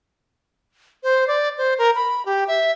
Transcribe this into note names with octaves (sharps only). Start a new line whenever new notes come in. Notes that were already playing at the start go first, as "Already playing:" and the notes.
C5
D5
C5
A#4
B5
G4
E5